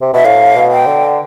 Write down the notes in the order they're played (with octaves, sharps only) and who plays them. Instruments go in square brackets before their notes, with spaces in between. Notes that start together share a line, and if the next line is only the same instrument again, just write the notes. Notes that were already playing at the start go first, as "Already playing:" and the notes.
[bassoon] C3
[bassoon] B2 [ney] E5
[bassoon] A2 [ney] F5
[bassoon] B2
[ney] G5
[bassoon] D3